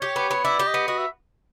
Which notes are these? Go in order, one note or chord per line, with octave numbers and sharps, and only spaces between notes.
G4 C#5
B3
B3
E4 D5
G4
D#5
B3
F#4 D#5
E5